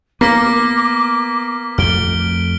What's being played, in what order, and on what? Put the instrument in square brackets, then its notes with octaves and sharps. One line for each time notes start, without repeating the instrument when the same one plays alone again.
[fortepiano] A#3 [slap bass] B3 [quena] D6 [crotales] F6 B6
[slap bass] F2 A3 [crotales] F6 D7 G7